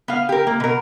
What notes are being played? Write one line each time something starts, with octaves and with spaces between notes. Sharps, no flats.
B3 F5
G4 A#4
A#3
B2 A#4